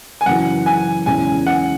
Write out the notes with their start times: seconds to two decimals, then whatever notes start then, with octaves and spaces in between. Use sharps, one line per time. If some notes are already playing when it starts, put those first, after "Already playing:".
0.21 G#5
0.26 F#2 C#3 E3 F#5
0.66 G#5
1.06 E2 C#3 G#3 C#4 E4 G#5
1.47 F#5